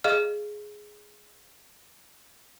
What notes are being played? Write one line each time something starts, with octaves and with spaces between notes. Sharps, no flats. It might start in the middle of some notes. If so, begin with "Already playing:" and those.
G#4 D#5 F5 F6